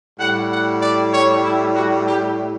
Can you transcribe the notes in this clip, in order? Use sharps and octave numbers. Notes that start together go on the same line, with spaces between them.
A2 G3 F#5
F#5
D5
C#5
E4
F#4
G4